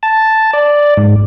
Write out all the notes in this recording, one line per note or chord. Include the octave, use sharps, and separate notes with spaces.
A5
D5
G#2